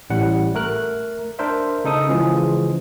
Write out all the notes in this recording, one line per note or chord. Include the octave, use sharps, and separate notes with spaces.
A1 A2 G3 F#5
A3 A#4 F#6
D4 A#4 C5 E5
C#3 D#4 A4 D#6
C#3 E3 F3 G#3 G#4